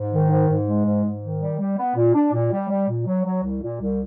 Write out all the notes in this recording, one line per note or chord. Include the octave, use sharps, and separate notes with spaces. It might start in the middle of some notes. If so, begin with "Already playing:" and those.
Already playing: G#2
D#3
G#2
G#2
G#3
G#2
G#2
D#3
G3
G3
B3
A#2
D4
A#2
G3
G3
A#2
F#3
F#3
C2
A#2
C2